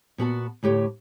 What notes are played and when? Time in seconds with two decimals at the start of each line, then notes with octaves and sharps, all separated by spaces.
0.18 A#2 B3 F#4 A5
0.63 D2 A2 G4 C#5